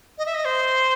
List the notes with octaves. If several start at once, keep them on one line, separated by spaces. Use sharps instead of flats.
D#5
E5
D#5
C5